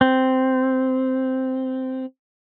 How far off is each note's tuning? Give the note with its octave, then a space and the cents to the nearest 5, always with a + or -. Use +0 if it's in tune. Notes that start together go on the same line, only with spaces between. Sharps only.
C4 -5